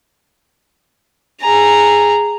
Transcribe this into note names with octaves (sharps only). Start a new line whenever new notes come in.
G#4 A#5